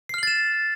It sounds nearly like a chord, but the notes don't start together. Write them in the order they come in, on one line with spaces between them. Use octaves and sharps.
C7 F6 F#7 A6 E7